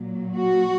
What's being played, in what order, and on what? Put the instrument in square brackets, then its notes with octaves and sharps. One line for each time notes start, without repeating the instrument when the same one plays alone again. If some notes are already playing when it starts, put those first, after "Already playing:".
Already playing: [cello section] A#2 F#3
F#4